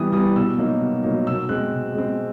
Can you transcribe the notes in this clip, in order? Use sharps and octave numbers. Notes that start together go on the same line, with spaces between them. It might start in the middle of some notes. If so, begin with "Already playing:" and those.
Already playing: E3 G3 B3 D#6
G3 B3 D#6
B2 E6
F#3 A#3 D#4
B2
F#3 A#3 D#4
B2 E6
G#3 C4 F#6
B2
G#3 C4